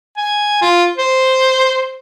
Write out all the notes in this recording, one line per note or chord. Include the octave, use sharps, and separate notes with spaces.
G#5
F4
C5